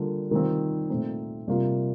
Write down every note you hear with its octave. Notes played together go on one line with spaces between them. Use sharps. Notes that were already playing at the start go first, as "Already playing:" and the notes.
Already playing: D3 G3 A#3 F4
D#3 G3 C4 F4
A#2 A3 C4 D#4
C3 G3 A#3 F4